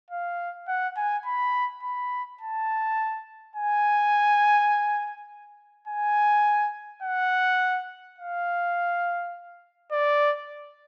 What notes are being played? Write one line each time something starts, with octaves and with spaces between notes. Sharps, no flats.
F5
F#5
G#5
B5
B5
A5
G#5
G#5
F#5
F5
D5